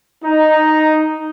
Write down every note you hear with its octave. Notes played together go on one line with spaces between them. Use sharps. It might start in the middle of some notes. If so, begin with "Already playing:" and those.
D#4